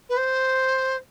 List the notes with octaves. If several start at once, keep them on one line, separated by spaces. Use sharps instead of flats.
B4
C5